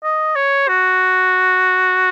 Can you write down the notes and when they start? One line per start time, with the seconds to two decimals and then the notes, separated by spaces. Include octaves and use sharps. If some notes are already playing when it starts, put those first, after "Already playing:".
0.03 D#5
0.36 C#5
0.68 F#4